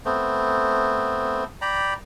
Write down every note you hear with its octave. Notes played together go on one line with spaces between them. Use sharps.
A3 B3 C4
D5 G5 A#5 B5